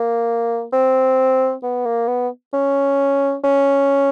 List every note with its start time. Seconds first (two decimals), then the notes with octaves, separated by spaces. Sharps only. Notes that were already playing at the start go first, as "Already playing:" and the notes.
Already playing: A#3
0.73 C4
1.63 B3
1.86 A#3
2.08 B3
2.53 C#4
3.44 C#4